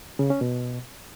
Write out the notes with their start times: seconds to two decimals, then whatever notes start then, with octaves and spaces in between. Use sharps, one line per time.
0.19 C#3
0.30 C#4
0.41 B2